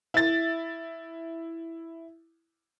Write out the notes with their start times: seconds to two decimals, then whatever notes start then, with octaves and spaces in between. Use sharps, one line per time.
0.14 E4 A6